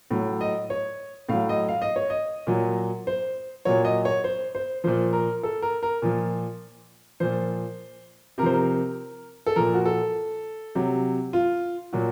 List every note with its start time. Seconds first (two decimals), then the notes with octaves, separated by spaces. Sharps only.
0.11 A2 F#3
0.41 D#5
0.70 C#5
1.29 A2 F#3 F5
1.49 D#5
1.69 F5
1.82 D#5
1.96 C#5
2.10 D#5
2.47 A#2 F#3
3.07 C5
3.65 A#2 F#3 C#5
3.85 D#5
4.05 C#5
4.24 C5
4.55 C5
4.84 A#2 F3 C5
5.13 A#4
5.43 A4
5.62 A#4
5.83 A#4
6.02 A#2 F3
7.20 A#2 F3 C5
8.38 C3 A#4
8.43 F3 C5
8.54 A#4
9.46 A4
9.56 A#2 F3 A#4
9.74 F#4
9.85 A4
10.75 C3 F#3
11.33 F4
11.93 A#2 F#3 F#4